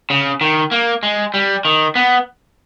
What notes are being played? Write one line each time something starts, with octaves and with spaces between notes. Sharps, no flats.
C#3
D#3
A#3
G#3
G3
D#3
B3